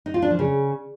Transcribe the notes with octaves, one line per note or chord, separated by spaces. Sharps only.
D#4
F4
D4
F3
C#3